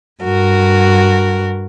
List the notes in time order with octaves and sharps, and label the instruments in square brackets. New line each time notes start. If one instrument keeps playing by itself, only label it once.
[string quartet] G2 F#4 A#4